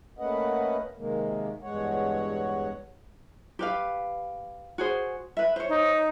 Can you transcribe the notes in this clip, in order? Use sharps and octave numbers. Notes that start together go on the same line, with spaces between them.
A3 A#3 C#4 B4 D#5 F#5
C3 D#3 G#3 A#3
E2 G2 G#3 C#5 F#5
G4 B4 F5
F#4 G#4 C5
B4 E5
C5 C#5
D#4